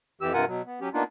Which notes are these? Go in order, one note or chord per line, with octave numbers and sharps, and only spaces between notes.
F2 E3 G4 E6
G2 C3 F4 A#4 F#5 G#5
B2 F#3
B3
F#3 C#4 G4
A#3 B3 D4 D#4 F4